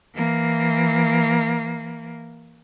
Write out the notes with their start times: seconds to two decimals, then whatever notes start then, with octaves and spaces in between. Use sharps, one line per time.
0.14 E3 A#3